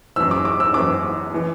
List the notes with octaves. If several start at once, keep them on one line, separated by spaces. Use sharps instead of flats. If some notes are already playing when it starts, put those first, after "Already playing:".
F#2 E3 E6
D6
D6
E6
F#2 E3 D6
E3